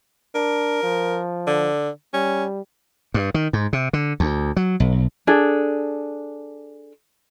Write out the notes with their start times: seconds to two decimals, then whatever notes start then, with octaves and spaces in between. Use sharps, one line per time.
0.35 D4 A#4
0.83 F3
1.47 D3
2.14 G3 C#4
3.14 G2
3.34 D#3
3.53 G#2
3.73 C3
3.93 D3
4.20 D2
4.56 F#3
4.80 B1
5.27 D4 G#4 A4